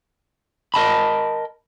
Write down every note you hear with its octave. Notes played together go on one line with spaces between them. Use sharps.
A#4 D#5 A5 B5